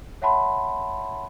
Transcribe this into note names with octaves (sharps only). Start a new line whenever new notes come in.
C#5 E5 F#5 A5 B5 C6